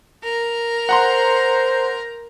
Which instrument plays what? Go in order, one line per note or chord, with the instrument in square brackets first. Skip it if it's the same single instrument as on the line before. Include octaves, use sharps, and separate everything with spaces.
[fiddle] A#4
[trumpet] C5 [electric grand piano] F#5 A#5 C6